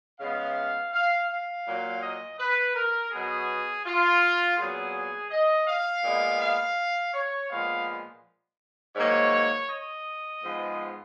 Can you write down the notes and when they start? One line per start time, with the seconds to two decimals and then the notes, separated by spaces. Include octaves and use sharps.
0.19 C#3 G#3 B3 F5
0.92 F5
1.29 F5
1.66 A#2 F#3 A#3
2.02 D#5
2.39 B4
2.75 A#4
3.11 B2 F#3 B3 G#4
3.85 F4
4.57 A#2 F#3 B3 G#4
5.31 D#5
5.67 F5
6.03 A#2 G#3 B3
6.40 F5
7.13 C#5
7.50 A#2 F3 G#3 B3 F5
8.96 G#2 D#3 F#3 A#3 C#5
9.69 D#5
10.42 G#2 F3 G#3 B3